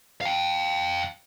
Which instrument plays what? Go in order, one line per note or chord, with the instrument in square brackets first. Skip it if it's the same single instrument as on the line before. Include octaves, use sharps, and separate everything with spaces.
[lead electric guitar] F5 G5